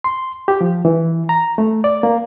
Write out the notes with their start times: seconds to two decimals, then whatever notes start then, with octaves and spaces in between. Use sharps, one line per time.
0.04 C6
0.48 G4
0.61 F3
0.85 E3
1.29 A#5
1.58 A3
1.84 D5
2.03 A#3